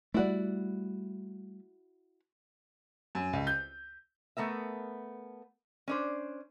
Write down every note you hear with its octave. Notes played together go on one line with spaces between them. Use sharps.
G3 A3 E4 F#4 D5
F#2
C#2
G6
A3 B3 A#4 E5
C#4 D4 C5